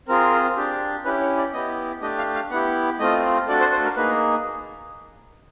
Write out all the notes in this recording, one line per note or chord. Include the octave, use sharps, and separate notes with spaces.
C4 F4 G#4 A#4
D4 G4
C#4 E4 G4 B4
C#5
D5
B3 E4 G4 D#5
A3 D4 G4 D#5
F5
F5
B3 E4 G4 F#5
A3 C4 F4 D#5
A3 D4 F#4 A4 D5
C5
C5
A#4
A#3 D#4 G#4 B4